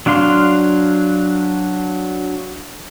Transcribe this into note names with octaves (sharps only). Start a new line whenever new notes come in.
F#3 D4 F5 C6